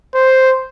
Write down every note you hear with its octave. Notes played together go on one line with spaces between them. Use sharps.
C5